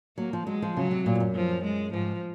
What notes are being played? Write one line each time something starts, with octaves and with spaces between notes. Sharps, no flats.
F#3 A#3
F3
F#3 G#3
F3
C#3 F#3
C3
A#2
G#2
F#2
F3
G#3
G#2 F3